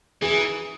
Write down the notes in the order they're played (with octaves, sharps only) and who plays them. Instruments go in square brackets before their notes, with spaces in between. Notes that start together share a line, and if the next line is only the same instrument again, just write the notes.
[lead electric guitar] E3 [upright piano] G#4